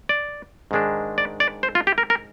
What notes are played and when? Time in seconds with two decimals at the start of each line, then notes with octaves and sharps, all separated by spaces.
0.09 D5
0.71 G#2 D#3 G#3 D4
1.18 D5
1.40 D5
1.63 C5
1.75 F4
1.87 G4
1.98 A#4
2.10 A#4